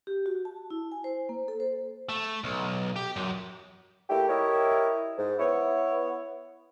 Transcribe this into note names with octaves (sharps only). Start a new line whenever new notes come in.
G4
F#4
A5
E4
G#5
C5
A#3
A4
C5
A3
B1
G4
F#2
A3 A#3 E4 G4
E4 G4 A#4 C#5 D#5 E5
G#2
B3 E4 C#5